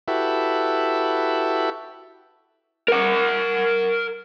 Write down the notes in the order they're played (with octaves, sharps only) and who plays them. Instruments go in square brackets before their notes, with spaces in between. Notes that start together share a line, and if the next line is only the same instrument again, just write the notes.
[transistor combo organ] E4 F#4 G4 A4 B4 E5
[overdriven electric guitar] A#4 F#5